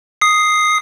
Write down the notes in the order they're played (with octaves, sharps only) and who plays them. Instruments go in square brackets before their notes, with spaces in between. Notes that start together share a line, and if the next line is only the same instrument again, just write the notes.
[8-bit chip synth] D#6 C7